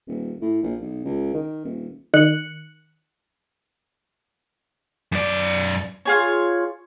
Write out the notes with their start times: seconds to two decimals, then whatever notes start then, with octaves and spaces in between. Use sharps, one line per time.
0.07 D#1
0.41 A2
0.62 A#1
0.82 B1
1.05 C#2
1.34 D#3
1.65 D#1
2.14 D#3 F#6 C#7
5.12 F#2 D5
6.05 F4 G#4 C#5